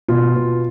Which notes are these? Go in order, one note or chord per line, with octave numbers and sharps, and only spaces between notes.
B2 F4
B2